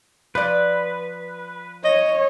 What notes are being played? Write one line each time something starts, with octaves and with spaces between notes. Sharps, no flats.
F3 B4 D5
C#5 D#5